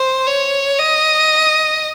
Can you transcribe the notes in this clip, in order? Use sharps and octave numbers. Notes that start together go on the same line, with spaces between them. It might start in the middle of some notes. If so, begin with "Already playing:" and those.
Already playing: C5
C#5
D#5